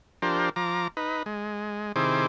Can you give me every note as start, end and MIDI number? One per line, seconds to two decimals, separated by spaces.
0.22 0.49 53
0.22 0.49 62
0.22 0.49 67
0.22 0.49 70
0.22 0.49 72
0.56 0.88 53
0.56 0.88 82
0.56 0.88 86
0.97 1.23 63
0.97 1.23 71
1.26 1.92 56
1.96 2.26 48
1.96 2.26 51
1.96 2.26 64
1.96 2.26 68
1.96 2.26 72
1.96 2.26 86